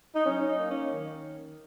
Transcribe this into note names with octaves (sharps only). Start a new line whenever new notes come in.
D#4
F#3 C#4
D#4
A#3
C#4
D#3